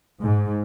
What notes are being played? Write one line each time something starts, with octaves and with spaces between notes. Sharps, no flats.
G#2